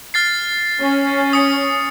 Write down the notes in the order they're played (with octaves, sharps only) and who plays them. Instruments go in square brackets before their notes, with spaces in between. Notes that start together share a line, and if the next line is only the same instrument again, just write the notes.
[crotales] F6 A6 C7
[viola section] C#4
[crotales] D#6 C#7